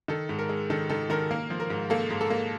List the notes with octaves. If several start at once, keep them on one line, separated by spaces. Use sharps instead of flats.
D#3 A4
G#2
A#4
G#3
D#3 A4
D#3 A4
D#3 A#4
A#3 A#4
F3
A#4
G#2
A#3 A4
G#2
A4
A#3